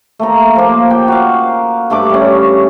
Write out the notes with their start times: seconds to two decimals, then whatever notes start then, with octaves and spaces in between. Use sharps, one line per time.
0.19 A3 A#3 A#5
0.55 F3 A#3
0.91 G5
1.08 F#4 F5
1.90 G2 A3 B5 D6
2.10 G3 C#4